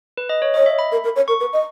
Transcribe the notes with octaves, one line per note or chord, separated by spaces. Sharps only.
B4
D#5
C#5
C#5 D#5
E5
B5
A#4
A#4
C#5
A#4 C#6
B4
D#5